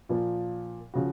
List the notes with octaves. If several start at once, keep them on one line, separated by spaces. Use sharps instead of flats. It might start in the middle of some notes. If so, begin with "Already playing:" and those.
A#2 F3 A#3
C#3 F3 F#4